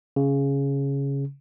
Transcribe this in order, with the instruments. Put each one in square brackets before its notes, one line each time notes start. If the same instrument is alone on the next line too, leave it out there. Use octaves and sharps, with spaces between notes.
[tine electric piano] C#3